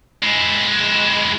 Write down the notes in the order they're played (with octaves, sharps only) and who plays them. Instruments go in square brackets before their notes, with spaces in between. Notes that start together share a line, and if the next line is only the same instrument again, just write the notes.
[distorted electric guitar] G#3 E4